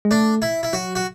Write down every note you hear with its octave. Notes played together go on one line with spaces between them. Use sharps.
G#3
A3 D4
E4
E4
F#3 F#4
F#4